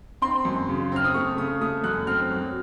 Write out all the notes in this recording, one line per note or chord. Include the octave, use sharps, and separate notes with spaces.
C4 C6
F#2
C#3
C4 F6
D#6
A3 C#6
C#3 D#6
A3 D#6
F#2 F#6
C4 F6
F#3